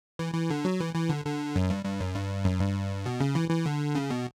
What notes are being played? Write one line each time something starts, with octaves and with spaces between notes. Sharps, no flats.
E3
E3
D3
F#3
E3
E3
D3
D3
F#2
G2
G2
F#2
G2
F#2
G2
B2
C#3
E3
E3
D3
C#3
B2